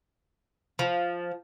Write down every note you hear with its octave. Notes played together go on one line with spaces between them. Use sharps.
F3